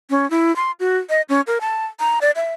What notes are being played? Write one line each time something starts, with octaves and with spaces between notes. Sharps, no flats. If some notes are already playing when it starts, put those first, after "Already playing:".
C#4
E4
C6
F#4
D#5
C#4
A#4
A5
A#5
D5
E5